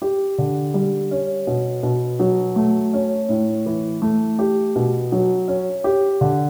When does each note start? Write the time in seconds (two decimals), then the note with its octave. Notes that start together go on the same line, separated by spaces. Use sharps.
0.02 G4
0.38 D3
0.74 G3
1.11 C#4
1.47 B2
1.83 B2
2.20 F#3
2.56 A3
2.93 C#4
3.29 A2
3.66 E3
4.02 A3
4.39 G4
4.76 B2
5.12 F#3
5.48 C#4
5.84 G4
6.21 D3